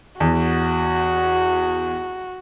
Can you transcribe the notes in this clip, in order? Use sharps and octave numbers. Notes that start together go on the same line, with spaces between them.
E2 F#4